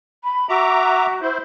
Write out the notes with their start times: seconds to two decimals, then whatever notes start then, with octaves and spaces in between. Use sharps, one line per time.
0.24 B5
0.49 F#4 E5 A#5 D6
1.21 E4 C5